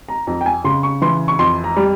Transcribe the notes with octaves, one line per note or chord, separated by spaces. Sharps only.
A#5
F2 A#5
G5
G#5
C#3 C6
C#6
E3 C6
C#6
F2 C6
A#5
G3